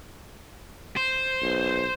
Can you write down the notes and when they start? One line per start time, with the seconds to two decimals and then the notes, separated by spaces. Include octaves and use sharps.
0.96 C5
1.42 B1